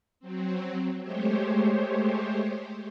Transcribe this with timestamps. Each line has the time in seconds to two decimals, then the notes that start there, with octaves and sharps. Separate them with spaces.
0.20 F#3 C4
1.02 G#3 A3 G4 C5 C#5